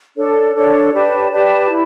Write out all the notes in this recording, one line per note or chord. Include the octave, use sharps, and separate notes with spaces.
D4 A4 C#5
D4 A4 C#5
G4 B4 D5 A5
G4 B4 D5 A5
E4